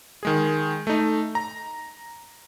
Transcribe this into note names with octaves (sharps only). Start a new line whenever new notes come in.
D#3 G#3 G#4
A3 D#4
A#5